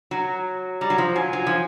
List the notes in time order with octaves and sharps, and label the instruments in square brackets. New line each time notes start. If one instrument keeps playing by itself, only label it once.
[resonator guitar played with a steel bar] F#3 [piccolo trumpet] A#5
[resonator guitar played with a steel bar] G3 [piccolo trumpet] A#5
[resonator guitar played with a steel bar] F#3
F3
[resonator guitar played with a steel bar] F#3 [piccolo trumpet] G#5
[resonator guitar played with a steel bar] F#3
F3